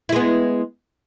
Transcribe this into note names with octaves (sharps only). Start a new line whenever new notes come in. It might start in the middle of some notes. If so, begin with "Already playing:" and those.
G#3 B3 E4